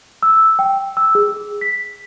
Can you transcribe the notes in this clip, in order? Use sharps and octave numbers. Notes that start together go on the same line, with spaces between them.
E6
G5
E6
G#4
B6